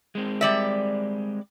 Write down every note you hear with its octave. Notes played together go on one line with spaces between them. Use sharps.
G#3 C4
G3 D5 E5